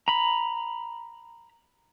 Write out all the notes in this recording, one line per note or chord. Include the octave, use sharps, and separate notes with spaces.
A#5 B5